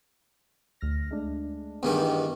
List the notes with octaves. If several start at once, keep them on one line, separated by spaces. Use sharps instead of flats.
D2 F6 A#6
G#3 A3 D4
E2 G2 D#3
E4